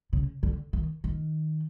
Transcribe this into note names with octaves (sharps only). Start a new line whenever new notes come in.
C#3
D3
D#3
D#3